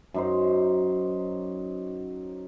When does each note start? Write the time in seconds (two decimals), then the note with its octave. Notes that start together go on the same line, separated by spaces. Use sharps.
0.14 F#2 D#4 C5